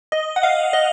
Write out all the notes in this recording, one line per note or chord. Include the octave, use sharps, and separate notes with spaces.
D#5
F#5
F5
D#5